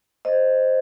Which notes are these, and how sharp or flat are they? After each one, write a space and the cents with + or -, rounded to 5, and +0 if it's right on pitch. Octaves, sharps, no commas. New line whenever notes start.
C5 +0 D#5 -5